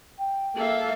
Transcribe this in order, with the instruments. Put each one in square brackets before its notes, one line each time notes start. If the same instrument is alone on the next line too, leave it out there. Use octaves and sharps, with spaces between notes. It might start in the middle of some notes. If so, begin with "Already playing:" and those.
[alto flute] G5
[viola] A#3 F5 [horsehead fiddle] A4 E5